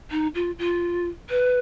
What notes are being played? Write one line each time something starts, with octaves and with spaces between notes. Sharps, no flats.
D#4
F4
F4
B4